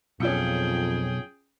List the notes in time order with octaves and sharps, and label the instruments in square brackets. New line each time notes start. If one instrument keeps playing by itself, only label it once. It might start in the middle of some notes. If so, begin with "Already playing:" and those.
[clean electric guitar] B1 [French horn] F2 [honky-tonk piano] C#4 F4 C#7 [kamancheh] G#4 G5